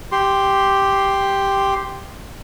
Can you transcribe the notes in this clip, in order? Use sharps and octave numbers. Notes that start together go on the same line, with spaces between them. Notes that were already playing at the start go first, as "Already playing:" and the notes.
G4 C6